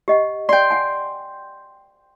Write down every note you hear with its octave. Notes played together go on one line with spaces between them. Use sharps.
G4 D#5 F#5
D5 G5 C6
F#5 G#5